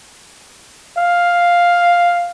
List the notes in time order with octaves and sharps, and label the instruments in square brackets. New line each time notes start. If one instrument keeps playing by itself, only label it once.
[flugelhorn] F5